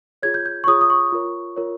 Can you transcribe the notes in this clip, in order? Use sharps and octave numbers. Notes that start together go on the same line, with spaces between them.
F4 G#4 C#5 G#6
G6
G6
C#6
F4 G#4 C#5 D#6
D#6
C#6
F4 A#4 C#5
F4 A#4 C#5